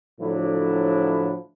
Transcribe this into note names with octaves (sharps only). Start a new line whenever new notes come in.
A2 D3 F3 F#3 D4 E4